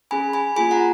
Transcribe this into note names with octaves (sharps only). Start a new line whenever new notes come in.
C#4 G#4 G#5 B5
G#5 B5
A#3 F4 G#4 G#5 B5
F#5 A#5